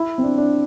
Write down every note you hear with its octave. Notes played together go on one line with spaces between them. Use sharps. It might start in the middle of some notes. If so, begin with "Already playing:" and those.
Already playing: E4
C4
D4
D4